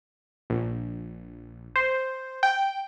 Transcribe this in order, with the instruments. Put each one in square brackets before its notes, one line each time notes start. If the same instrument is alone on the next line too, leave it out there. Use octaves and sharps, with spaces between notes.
[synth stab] A#1
C5
G5